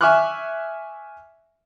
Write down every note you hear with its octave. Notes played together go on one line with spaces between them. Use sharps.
E5 G#5 C#6 D6 F6 F#6